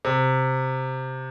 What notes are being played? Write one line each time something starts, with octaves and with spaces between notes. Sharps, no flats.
C3